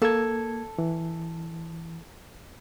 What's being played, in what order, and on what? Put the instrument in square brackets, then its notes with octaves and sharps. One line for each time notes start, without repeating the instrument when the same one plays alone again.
[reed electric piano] A#3 G#6 [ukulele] A4
[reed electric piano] E3